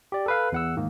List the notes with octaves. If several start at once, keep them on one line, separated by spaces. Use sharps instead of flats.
G4 D5
A4 B4 F5
E2 F#5 E6
G#2 D#3 A#3